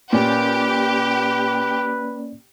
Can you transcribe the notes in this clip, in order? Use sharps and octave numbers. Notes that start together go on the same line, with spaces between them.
A#2 A#3 C#4 G4 B4 D5